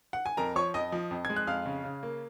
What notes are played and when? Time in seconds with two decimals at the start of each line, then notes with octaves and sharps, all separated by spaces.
0.13 F#5
0.26 G#5
0.37 F2 A#4 A#5
0.55 F3 C#5 C#6
0.74 F2 D#5 D#6
0.92 F3
1.11 F2
1.25 G#3 G#6
1.36 F#6
1.47 F2 F5 F6
1.66 C#3
1.84 C#3
2.03 A#3